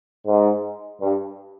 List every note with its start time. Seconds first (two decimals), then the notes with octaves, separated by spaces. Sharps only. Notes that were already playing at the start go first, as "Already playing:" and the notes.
0.26 G#2
1.01 G2